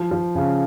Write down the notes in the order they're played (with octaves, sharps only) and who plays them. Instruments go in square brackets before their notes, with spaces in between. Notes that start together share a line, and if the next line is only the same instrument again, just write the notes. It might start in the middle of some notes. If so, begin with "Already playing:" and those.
Already playing: [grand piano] F3
F3
C#3